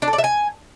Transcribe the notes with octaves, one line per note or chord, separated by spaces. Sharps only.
D4
A4
D5
E5
G#5